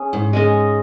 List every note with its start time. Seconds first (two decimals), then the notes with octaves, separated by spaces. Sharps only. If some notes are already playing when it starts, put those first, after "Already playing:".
Already playing: C#4 G#4
0.13 G#2
0.33 G#3 C#4 G#4 D#5